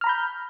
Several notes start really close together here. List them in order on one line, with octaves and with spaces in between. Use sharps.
F6 A#5 B5 G6